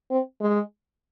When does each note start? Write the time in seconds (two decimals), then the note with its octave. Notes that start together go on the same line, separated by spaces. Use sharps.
0.10 C4
0.41 G#3